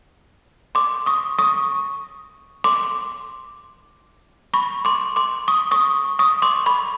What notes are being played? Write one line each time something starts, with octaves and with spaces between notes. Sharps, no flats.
C6 D6
C#6 D#6
C#6 D#6
C6 D6
B5 C#6
C6 D6
C6 D6
C#6 D#6
C#6 D#6
C#6 D#6
C6 D6
B5 C#6